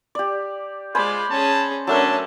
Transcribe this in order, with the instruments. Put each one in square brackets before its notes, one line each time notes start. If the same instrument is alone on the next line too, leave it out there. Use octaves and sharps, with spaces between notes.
[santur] G4 D5
[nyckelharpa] G#3 D5 [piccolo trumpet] F4 [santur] C5 G#5 B5
[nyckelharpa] C#4 G#4 [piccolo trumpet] A5
[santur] F#3 A3 A#4 [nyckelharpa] C#4 D4 [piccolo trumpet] A5